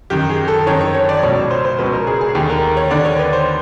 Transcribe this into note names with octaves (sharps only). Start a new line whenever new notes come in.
F#2 D#3 G4
G#4
A4
F#2 D#3 C#5
C#5
C#5
D5
C#2 B2 C#5
C5
C5
C#2 B2 B4
A#4
G#4
G#4
D#2 D3 G4
A#4
C#5
D#2 D3 D5
C#5
B4
C5